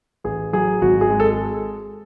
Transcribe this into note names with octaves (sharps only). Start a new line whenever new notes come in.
A1 G#4
F#3 G#4
G#1 F#4
G#4
G#3
A4